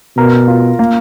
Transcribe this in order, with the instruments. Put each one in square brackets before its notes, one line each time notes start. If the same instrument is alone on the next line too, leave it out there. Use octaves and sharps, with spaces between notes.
[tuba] B2 [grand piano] A#4
[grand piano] F4
A#3